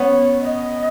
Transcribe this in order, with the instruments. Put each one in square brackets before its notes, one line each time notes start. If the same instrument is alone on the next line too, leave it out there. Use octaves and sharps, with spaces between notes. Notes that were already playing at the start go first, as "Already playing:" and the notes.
Already playing: [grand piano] B3 C#4 [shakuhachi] C#5
[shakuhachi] D#5